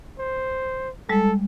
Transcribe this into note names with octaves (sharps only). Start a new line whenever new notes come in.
C5
G3 G#3 A4